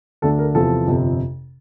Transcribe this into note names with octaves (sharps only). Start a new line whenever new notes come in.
D2 D3 A3 D4 A4
A#4
E2 C3 F3 A4
G1 F2 C3